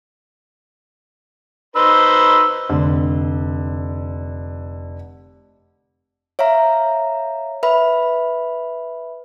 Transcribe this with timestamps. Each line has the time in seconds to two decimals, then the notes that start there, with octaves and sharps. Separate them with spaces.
1.76 D#4 B4 C5 E6
2.70 F1 D3
6.39 C#5 E5 F5 A#5
7.63 B4 E5 B5